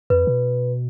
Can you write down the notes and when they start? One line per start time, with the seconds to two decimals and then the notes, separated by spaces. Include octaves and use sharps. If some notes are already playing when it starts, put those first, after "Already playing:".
0.10 F2 B4
0.27 B2